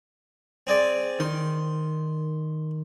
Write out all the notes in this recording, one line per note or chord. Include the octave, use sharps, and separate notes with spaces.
C4 G#4 D5
D#3 C6